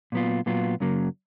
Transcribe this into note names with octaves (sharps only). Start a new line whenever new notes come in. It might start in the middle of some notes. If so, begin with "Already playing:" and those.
A#2 F#3 B3 F4
A#2 F#3 B3 F4
F#2 C#3 F#3 A#3